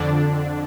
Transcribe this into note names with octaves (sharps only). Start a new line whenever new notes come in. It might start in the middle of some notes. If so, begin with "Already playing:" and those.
Already playing: F2 D3 D4